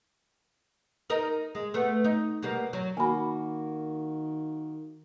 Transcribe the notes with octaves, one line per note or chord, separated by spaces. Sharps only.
D#4 A#4 D#5
G#3
A3 B3
D#4
B2 G3 A#3
F#3
D#3 A#3 F#4 G#5 B5